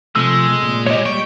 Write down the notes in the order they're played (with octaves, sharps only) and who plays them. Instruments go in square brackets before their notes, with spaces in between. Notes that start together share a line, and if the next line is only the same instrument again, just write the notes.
[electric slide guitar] C3 F3 A3 [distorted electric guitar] G#3 [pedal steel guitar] E6
[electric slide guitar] A#2
[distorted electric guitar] G#3 G4 [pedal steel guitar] C#5 D#5
[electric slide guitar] G3 [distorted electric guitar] G5 [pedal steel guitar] C#6